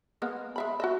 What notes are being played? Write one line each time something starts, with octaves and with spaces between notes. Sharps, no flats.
G#3 A#3 B3
G#3 E5 B5
F#4 D#5 E5